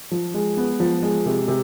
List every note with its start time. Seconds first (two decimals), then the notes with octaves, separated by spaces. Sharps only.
0.11 F3
0.34 G#3
0.57 B3
0.80 F3
1.03 G#3
1.25 C3
1.48 C3